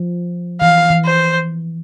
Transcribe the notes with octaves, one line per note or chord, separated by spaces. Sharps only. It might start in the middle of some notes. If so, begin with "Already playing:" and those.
Already playing: F3
E3 F5
E3
C5